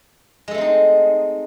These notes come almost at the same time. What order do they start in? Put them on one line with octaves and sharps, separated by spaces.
G#3 A4 A3 C4 D#4